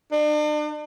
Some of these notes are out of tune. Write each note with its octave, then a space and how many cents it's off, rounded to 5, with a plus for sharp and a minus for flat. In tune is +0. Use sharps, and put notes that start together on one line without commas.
D4 +40